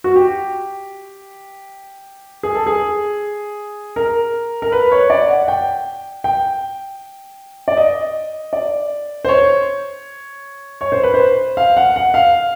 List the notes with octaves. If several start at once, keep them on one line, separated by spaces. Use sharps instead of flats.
F#4
G4
G#4
A4
G#4
A#4
A#4
B4
C#5
D5
F#5
G5
G5
D5
D#5
D5
C5
C#5
C#5
C5
B4
C5
F5
F#5
F#5
F5